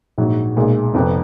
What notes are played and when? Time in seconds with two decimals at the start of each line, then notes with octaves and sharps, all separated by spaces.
0.18 A#1 G#2 F#3
0.56 B1 A#2 G#3
0.94 F1 F2 F3 B3